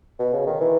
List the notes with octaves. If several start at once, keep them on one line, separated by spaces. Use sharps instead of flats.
B2
C#3
D#3
E3